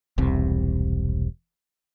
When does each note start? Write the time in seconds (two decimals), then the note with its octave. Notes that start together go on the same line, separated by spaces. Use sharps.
0.18 E1 C2 C3